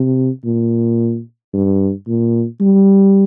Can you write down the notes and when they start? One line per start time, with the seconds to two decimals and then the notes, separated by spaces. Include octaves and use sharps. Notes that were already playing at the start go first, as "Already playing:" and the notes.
Already playing: C3
0.45 A#2
1.54 G2
2.07 A#2
2.61 G3